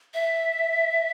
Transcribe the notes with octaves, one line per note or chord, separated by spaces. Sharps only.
E5